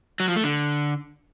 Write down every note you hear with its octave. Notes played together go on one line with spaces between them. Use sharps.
F#3
F3
A3
D3